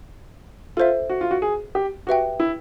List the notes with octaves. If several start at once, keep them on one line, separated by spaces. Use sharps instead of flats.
F4 A4 C5 E5
F#4
F4
F#4
G#4
G4
F#4 G4 B4 E5 G5
E4